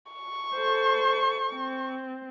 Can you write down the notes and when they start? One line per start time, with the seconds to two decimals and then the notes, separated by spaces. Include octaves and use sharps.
0.12 C#6
0.54 A4 C5
1.53 C4